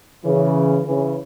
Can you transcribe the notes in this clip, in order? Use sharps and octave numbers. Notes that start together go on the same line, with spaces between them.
C#3 E3
C#3 E3